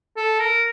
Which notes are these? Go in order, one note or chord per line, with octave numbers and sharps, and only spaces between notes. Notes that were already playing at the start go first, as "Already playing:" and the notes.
A4
A#4